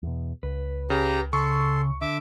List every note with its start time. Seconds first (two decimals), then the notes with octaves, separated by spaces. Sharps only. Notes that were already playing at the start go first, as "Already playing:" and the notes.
0.03 E2 B2
0.43 C#2 B4
0.90 C#3 G4 A#5
1.33 C#3 A4 C6 C#6
2.01 D3 E5 D6